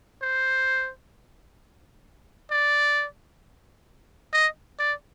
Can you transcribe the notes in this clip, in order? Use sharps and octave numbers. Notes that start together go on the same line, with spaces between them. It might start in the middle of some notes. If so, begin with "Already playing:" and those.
C5
D5
D#5
D5